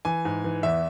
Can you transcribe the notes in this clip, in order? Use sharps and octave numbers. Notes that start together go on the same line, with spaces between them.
E3 G#5
G#2
E3
E2 E5